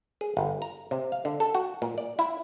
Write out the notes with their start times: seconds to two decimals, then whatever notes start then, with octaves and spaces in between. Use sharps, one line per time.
0.21 G#4
0.37 G1
0.62 A#5
0.91 C3
1.12 F5
1.25 D3
1.40 A4
1.55 F#4
1.82 A#2
1.98 D5
2.19 E4